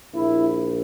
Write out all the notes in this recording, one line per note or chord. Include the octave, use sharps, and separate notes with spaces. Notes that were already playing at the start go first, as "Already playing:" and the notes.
A#1 E4